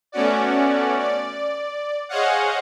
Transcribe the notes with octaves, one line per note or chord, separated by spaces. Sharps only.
A3 B3 C#4 F#4 D5
D5
G#4 C5 C#5 D#5 F5 F#5